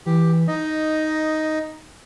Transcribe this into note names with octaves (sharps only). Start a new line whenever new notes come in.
E3 G4
D#4 D#5